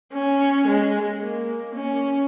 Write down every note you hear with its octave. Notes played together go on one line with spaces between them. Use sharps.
C#4
G#3
A#3
C#4